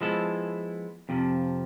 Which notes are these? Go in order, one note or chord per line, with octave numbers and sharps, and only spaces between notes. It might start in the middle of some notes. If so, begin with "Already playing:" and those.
F3 G#3 B3 E4 A4
F2 C3 F3